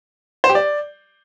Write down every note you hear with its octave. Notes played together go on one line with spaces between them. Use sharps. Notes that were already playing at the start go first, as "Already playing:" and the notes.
C5
G4
D5